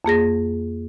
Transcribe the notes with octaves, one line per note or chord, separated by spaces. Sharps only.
F2 A#3 G#4 A#6